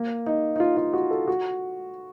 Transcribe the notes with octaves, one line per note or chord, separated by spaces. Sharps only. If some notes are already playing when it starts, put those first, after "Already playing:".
Already playing: A#3
D#4
D#4
F4
F4
F#4
A4
F#4